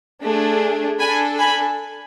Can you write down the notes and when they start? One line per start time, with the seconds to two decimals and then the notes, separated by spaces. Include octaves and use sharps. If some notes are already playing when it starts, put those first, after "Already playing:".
0.22 A3 D4 G#4
1.00 D4 A4 G#5 B5
1.39 G#5 B5